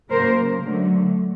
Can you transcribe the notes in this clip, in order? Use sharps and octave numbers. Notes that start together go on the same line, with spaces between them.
C#3 F#3 A#3 A#4 C5
D3 F#3 A3